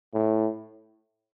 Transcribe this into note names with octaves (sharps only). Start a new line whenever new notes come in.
A2